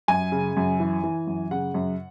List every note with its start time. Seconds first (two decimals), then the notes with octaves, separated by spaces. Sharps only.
0.08 F#2 G#5
0.32 C#3
0.57 F#2
0.80 E3
1.04 E3
1.27 F#2
1.51 C#3 F#5
1.74 F#2